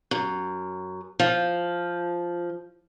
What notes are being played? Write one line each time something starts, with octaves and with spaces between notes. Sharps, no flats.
F#2
F3